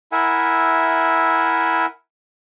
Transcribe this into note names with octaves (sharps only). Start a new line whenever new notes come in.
E4 A#4 E5 F#5 G#5